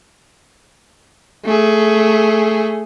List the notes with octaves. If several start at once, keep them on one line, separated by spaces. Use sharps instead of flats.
A3 G#4